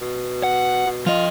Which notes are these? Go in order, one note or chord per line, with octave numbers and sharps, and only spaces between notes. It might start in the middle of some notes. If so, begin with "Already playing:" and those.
B2
F#5
B2
F3 F4 D#5